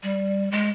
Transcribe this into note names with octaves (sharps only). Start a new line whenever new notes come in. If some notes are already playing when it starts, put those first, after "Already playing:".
G3
G#3